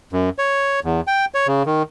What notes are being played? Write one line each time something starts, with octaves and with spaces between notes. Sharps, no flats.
F#2
C#5
E2
G5
C#5
C#3
D#3